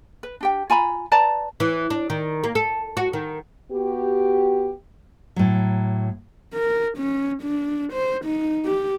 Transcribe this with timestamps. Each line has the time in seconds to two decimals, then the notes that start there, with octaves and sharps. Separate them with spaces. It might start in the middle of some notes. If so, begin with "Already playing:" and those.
0.23 B4
0.41 D4 G4 G5
0.70 F4 G#5 A#5 B5
1.12 B4 D5 A5 A#5
1.60 E3
1.90 D4
2.10 D#3
2.44 A#3
2.55 A4
2.97 F#4
3.13 D#3
3.72 B3 F#4 G4
5.36 A2 F#3
6.54 A#4
6.97 C#4
7.42 D4
7.93 C5
8.25 D#4
8.65 G4